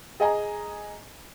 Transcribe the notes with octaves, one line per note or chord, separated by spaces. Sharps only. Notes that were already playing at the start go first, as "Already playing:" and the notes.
G#4 D#5 G#5 A#5